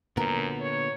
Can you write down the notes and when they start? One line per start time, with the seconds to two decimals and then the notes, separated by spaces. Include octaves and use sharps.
0.17 F#2 A#2 D3 B3 A#4
0.61 C#5